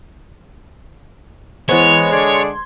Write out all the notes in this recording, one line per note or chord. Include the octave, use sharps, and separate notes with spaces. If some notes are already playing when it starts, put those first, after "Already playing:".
E3 G#3 B3 C5 C#5
D3 G#4 D5 C6 G#6